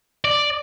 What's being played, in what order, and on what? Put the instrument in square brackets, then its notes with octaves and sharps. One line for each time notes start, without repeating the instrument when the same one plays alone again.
[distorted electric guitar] D5